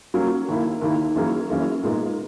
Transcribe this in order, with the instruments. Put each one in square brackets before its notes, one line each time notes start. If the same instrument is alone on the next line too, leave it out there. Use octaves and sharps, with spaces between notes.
[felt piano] F#3 A#3 C#4
D#2 D#3 A#3 E4
D#2 D#3 A#3 E4
F#2 E3 A#3 C#4 G#4
F#2 E3 A#3 C#4 G#4
A#2 G#3 B3 D#4